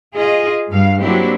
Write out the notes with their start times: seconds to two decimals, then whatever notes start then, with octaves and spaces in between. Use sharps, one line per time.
0.15 F4 G#4 D#5
0.69 G2 F5
1.01 F#3 A#3 C4 D4 E4 G4